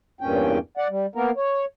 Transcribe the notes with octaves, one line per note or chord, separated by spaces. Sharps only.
E2 G2 A#2 C#4 G5
D5 F#5
G3
A#3 B3 A#4
C#5